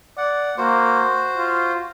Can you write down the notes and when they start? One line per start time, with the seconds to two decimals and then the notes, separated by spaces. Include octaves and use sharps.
0.17 D5 F#5
0.58 A#3 F#4 C5
1.37 F4